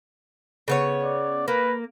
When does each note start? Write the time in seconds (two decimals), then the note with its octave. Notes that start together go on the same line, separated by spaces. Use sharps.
0.68 C#3 B3 C#5
1.03 D5
1.48 A#3 B4